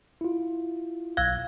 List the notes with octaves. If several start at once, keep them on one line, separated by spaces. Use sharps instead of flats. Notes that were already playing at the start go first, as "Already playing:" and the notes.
E4 F4
B1 F5 E6 F#6 G#6